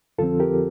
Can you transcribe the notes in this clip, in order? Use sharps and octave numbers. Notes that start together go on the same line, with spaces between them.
F2 D3 F3 C4 F4 A4
G4 A#4